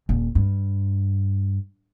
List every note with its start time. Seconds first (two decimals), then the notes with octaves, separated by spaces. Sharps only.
0.09 D#1
0.35 G2